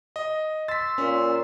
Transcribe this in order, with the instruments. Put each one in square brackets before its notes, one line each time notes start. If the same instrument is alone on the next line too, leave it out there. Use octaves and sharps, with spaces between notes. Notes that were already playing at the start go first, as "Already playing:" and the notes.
[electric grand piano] D#5
[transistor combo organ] C6 E6 [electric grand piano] A6 B6
[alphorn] A#2 [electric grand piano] C#4